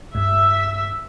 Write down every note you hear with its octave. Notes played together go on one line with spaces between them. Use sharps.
G2 E5